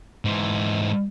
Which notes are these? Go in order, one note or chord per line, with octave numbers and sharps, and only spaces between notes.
G#2 E3